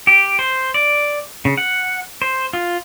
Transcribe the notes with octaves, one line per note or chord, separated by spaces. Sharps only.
G4
C5
D5
C#3
F#5
C5
F4